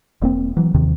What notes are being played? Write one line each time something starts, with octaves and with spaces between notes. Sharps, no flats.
E1 A#3 C4
E3 F#3
D#2 C3 D#3